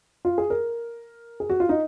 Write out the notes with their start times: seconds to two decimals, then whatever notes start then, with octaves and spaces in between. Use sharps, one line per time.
0.25 F4
0.38 G#4
0.50 A#4
1.40 G#4
1.50 F#4
1.60 F4
1.69 D#4